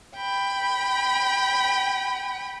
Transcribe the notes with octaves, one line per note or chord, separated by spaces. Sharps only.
G5 B5